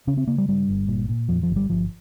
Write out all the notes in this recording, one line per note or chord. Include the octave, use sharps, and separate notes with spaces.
C#3 C#4
C4
C#3 A#3
G3
G2 G3
G1
A#2
A#2
F2 F3
F3
G1
G3
G1 F3